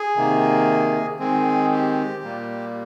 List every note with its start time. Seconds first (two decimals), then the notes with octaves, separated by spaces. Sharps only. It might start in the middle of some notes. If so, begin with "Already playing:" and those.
Already playing: G#4
0.16 C3 D#3 A#3
1.20 D#3 G#3 C4 G#4
1.72 G4
2.23 A#2 G3 A#3